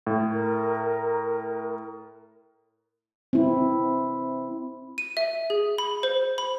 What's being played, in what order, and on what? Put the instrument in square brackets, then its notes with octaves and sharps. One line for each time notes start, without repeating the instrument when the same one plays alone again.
[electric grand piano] A2
[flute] A#4
[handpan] C4 E4
[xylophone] D#7
E5
G#4
B5
C5
B5